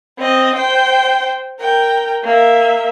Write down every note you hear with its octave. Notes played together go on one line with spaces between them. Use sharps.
C4 D#5
C5 G5
A#4 G5
A#3 E5